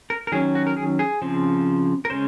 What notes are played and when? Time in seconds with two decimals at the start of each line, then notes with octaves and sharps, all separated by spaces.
0.10 A#4
0.27 A#4
0.32 D#3 F#3 C#4 G#4
0.55 F#4
0.67 A#4
0.77 G#4
0.99 G#4
1.22 C#3 F3 C4
2.05 A#4
2.10 C#3 G#3 C#4 C5